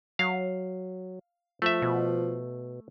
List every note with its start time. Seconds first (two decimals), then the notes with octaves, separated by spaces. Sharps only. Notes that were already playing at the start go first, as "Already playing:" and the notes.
0.19 F#3 F5
1.62 F3 A3 E5
1.82 B2